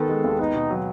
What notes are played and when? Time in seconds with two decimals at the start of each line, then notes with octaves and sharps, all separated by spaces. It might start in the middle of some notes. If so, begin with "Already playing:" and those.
Already playing: D#3 B3 A4
0.09 G#3
0.24 D#2
0.39 B3 D#4
0.55 B2
0.70 F#3